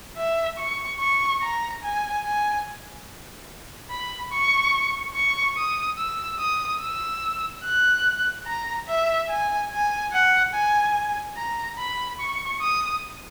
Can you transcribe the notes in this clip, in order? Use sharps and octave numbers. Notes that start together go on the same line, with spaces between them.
E5
C#6
C#6
A#5
G#5
G#5
B5
C#6
C#6
D#6
E6
D#6
E6
F#6
A#5
E5
G#5
G#5
F#5
G#5
A#5
B5
C#6
D#6